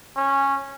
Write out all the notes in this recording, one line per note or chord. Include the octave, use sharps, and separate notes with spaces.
C#4